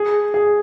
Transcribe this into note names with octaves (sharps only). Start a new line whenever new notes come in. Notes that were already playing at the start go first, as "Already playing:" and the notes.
Already playing: G#4
G#4